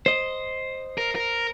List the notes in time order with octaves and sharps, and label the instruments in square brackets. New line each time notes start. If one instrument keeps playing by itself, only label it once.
[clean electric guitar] C5 D#5
[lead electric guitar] A#4
A#4